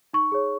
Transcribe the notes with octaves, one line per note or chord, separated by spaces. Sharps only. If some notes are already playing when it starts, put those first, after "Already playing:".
D#4 C#6
G#4 C#5